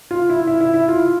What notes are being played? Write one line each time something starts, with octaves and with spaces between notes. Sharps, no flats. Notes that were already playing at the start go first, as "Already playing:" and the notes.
F4
E4
E4
E4
E4
F4